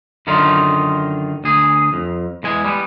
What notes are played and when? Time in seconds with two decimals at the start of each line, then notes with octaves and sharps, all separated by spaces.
0.27 F#2 D3 D#3 D#4 F4
1.44 D2 G#4
1.93 F2
2.43 E2 G#3 G#5
2.65 G3 B3